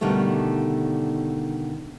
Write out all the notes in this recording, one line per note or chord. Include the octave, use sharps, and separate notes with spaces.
B2 D3 D#3 G3 A3